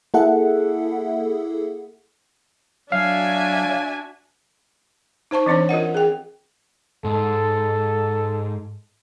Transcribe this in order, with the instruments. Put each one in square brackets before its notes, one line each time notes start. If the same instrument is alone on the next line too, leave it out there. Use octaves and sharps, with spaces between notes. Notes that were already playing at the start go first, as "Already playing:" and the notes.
[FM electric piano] A#3 E4 G#4 A4 E5 F#5
[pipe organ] F#3 [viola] D4 F#4 [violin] E5 G#5 [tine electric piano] F5
[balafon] D#4 C5 A5 C#6
E3 C4 D4 C5 C#5
F4 A#4 D#5 F#5
G#4 G5
[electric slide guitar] G#2 [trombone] A4